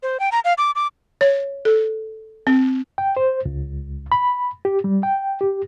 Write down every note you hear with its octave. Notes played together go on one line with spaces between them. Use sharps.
C5
G5
A#5
F5
D6
D6
C#5
A4
C4
G5
C5
C#2
B5
G4
G3
G5
G4